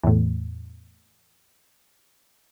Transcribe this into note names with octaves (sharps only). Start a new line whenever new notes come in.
E2 A2